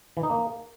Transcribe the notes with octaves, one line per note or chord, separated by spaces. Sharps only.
E3
D#4
A#3